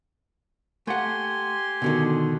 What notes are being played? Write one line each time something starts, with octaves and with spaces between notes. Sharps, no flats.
A3 G4 F#5 G#5 C6
B2 D3 D#3